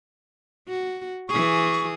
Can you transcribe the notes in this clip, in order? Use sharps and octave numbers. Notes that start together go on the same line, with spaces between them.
F#4
E3 G#4 C#6